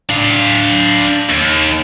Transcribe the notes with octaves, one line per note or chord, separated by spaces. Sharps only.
D4 F5
D#2